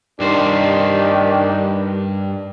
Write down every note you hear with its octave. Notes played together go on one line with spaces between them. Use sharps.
G2 D#3 D4 G4 C5